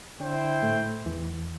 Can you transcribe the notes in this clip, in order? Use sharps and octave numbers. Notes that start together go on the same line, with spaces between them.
D3 D4 E4 C5 G5
A2 A3
E2 E3